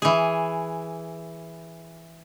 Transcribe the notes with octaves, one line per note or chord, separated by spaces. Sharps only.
E3 G#4